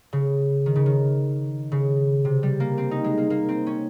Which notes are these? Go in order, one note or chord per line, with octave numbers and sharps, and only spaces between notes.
C#3
D#3
C#3
D#3
C#3
C3
G3
A#3
C4
D#4
G#3
A#3
A#3
C4
C#4